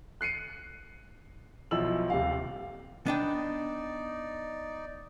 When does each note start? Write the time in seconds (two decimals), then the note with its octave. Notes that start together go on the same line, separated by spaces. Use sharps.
0.21 F#6 C7 C#7 D#7
1.71 B1 F3 E4 E6 F#7
2.10 D#1 C3 F5
3.06 B3 D4 D#4 D5 G5